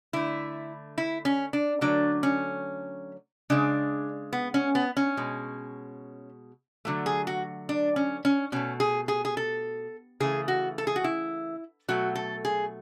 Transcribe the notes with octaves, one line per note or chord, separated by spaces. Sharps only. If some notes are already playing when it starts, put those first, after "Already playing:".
D3 A3 E4
E4
C#4
D4
D3 F#3 A3 D4
C#4
C#3 G#3 D4
B3
C#4
B3
C#4
B2 G#3
D3 F#3 A3
G#4
F#4
D4
C#4
C#4
B2 A3 C#4
G#4
G#4
G#4
A4
C#3 E3 A3 G#4
F#4
A4
G#4
F#4
E4
B2 F#3 A3 F#4
A4
G#4